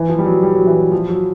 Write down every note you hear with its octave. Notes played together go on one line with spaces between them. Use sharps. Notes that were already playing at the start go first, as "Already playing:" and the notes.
Already playing: E3
F3
G3
F#3
G3
F#3
E3
F3
F#3